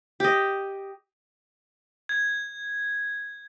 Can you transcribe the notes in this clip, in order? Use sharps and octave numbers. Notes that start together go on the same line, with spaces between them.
G4 D#5
G#6